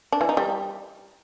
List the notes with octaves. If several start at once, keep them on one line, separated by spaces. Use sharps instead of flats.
D4
E3
D#4
G3